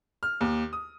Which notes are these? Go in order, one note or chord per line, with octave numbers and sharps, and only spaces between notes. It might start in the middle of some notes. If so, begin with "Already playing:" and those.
F6
D#2
D#6